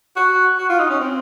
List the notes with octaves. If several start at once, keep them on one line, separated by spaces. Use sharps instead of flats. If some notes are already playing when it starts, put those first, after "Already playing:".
F#4
F#4
F4
D#4
C#4
C4